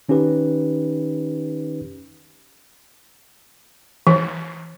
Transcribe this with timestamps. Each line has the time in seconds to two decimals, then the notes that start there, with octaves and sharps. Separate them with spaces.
0.09 D#3 C#4 D#4 G4 B4
4.07 E3